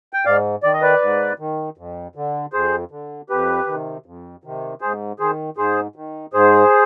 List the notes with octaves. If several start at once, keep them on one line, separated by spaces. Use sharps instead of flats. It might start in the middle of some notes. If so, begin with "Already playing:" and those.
G5
G#2 D5 F5
D#3 D5
D#5
B4 D5
G#2
D#3
F2
D3
F2 G#4 C5
D3
F2 G4 B4
C3 D#3
F2
C3 D#3
G#2 G#4 C5
D#3 G#4 C5
G#2 G#4 C5
D#3
G#2 G#4 C5